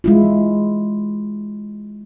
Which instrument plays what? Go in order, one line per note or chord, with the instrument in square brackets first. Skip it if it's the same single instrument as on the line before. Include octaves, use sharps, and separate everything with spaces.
[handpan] G#3 E4 F4